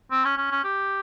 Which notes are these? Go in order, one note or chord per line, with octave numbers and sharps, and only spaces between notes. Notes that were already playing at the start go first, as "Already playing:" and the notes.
C4
C#4
C#4
C#4
G4